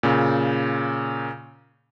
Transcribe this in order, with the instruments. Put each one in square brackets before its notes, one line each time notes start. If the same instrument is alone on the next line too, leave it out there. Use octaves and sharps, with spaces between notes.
[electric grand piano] A#2 C#3